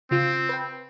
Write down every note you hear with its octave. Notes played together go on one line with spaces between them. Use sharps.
C#3 C4 F4
B4 G5